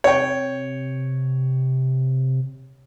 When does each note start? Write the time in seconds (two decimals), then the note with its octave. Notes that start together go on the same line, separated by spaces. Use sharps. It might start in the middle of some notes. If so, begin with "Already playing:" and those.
0.04 C3 C#5 G5